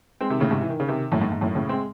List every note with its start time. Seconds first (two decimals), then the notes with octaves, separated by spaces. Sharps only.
0.21 G#3 C4
0.30 C3 D#3
0.40 A2 C#3
0.51 G#2 C3
0.61 E3
0.70 D#3
0.80 C#3
0.88 C3 D#3
1.12 F#2 A2
1.21 G#2
1.32 G#2
1.41 F#2 A2
1.55 A2 C#3
1.69 G#3 C4